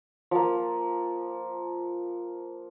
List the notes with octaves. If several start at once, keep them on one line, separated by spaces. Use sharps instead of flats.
F3 A#3